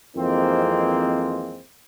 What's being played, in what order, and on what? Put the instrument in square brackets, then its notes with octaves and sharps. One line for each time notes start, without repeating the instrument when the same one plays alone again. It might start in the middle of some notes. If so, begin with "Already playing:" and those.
[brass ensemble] F2 D#3 E3 G#3 A#3 C4